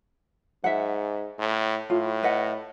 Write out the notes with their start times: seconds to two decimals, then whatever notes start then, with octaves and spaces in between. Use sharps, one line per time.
0.64 G#2 E5 F#5
1.39 A2
1.90 A2 F4
2.23 B4 D#5 F#5